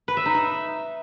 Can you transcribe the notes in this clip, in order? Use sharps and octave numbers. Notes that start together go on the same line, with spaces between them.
B4
E5
D#4
E5